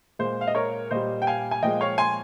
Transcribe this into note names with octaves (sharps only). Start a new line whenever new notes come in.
A#2 G#3 C5
F5
D#5
A#4 C#5
A#2 G3 C5 D#5
G5
F5 G#5
G#5
A#2 F3 G#3 D#5 G5
C#5 F5
G#5 C6